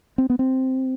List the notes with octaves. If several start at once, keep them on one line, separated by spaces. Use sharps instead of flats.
C4
B3
C4